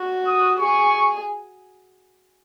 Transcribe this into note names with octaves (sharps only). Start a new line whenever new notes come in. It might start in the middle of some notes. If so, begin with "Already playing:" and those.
Already playing: F#4
D#6
G#4 C#6